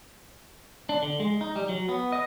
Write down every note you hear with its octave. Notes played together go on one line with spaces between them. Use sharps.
D4
D3
G#3
D#4
G3
F#3
B3
D#5